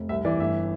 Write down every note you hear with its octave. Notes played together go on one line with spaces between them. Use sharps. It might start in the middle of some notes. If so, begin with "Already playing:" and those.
Already playing: F1
C2 E5
E3 D5
G1 E5